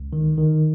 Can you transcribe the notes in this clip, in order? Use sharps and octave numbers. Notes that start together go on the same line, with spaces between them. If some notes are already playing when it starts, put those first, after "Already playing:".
Already playing: C#2
D#3
D#3